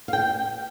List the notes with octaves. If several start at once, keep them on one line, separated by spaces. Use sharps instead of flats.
F5
G5